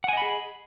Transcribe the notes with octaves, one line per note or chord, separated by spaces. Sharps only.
G#4 D#5 F#5 G#5 B5